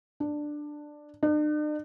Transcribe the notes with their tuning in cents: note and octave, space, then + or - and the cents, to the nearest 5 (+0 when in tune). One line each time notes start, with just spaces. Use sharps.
D4 +10
D4 +45